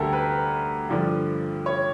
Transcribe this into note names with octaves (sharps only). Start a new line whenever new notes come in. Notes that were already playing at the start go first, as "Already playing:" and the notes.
Already playing: D2 D3 G3 F#4 G4 A4 A#4
B4
G2 D3 F3
C#5